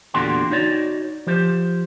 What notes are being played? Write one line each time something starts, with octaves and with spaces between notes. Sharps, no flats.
E2 A#2 D3 F#4 G4 C6
D#4 F#4 C#5 D5
F3 G4 C5